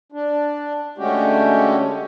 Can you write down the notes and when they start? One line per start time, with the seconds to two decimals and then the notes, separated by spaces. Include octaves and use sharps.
0.12 D4
0.98 D3 G#3 A3 C#4 F#4 G4